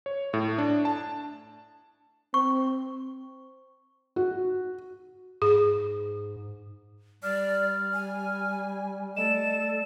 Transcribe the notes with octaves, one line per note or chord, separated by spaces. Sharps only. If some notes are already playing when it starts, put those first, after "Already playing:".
C#5
A2
D4
A5
C4 C#6
F#4
G#2 G#4
G3 D5 F6
G#5
A3 A4 D5 D#5 E7